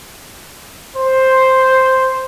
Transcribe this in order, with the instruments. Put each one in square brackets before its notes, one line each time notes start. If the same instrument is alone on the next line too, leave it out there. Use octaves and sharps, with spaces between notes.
[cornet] C5